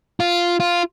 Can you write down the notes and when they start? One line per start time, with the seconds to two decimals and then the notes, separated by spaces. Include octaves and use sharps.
0.20 F4
0.60 F4